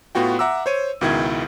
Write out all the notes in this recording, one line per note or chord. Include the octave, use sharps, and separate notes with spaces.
A2 B3 F4 F#4 G5
E5 F#5 A#5 D6 E6
C5 C#5 D#7
C#2 B2 D#3 E4 G5 G#6